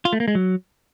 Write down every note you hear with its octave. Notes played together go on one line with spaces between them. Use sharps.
F4
A3
A#3
G#3
F#3